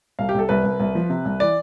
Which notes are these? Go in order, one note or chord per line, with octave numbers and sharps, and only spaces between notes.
C2 F5
G4
C2 A4
C2 B4
C2
C2
F3
C3
C2
E3 D5